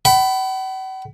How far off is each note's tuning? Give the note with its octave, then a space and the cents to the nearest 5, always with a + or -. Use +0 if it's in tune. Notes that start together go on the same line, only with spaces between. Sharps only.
F#5 +45 B5 +15